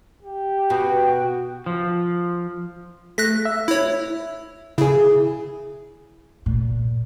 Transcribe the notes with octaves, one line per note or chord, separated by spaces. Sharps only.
G4
B2 F#4 G5
F3
A3 F#6 A#6 B6
E5
E4 C#5
C#3 E4 G#4
A#2